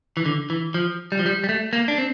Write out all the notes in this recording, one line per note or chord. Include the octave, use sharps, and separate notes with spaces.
E3
D3
E3
F3
G3
F3
G3
G3
A3
A#3
D4
C4